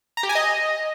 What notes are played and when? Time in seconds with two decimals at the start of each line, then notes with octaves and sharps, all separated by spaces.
0.17 A#5
0.23 G4
0.29 G#5
0.35 D#5